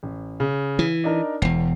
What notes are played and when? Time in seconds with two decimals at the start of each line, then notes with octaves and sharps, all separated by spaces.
0.03 A1
0.40 C#3
0.79 E3
1.04 D4 D#4 A#4
1.42 E1 E2 C7